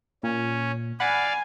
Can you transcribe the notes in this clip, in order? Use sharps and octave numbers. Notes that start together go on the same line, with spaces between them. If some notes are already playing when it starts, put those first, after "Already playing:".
A#2 C#4
D5 F5 F#5 G#5 B5